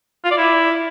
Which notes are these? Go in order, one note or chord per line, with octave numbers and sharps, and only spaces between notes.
F4
D5
E4